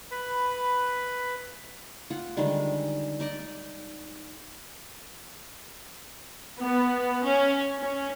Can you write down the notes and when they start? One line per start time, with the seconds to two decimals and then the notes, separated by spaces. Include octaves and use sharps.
0.11 B4 B5
2.10 F4 F#5
2.37 D3 D#3 G3 G#3
3.20 D#4 D5 D#5
6.59 B3
7.26 C#4
7.78 C#4